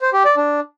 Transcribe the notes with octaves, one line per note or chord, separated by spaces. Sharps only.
C5
G4
D5
D4